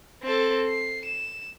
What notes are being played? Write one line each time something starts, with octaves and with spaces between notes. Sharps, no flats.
C4 A4
C7
E7